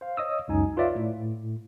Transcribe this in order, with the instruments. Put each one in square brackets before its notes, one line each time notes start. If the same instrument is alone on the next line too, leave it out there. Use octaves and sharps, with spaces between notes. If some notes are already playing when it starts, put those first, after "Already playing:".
[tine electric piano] C5 F5
C#5 D#5 D#6 E6
C#2 F#2 D#4 G#5
F4 B4 C#5 D5 E5 F5
A2